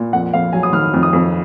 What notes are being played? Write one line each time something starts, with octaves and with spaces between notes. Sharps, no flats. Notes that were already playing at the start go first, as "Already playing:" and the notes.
Already playing: A#2
F2 F#5
F2 F5
F#3 G#5
D#6
D#3 F6
F2
D#6
F2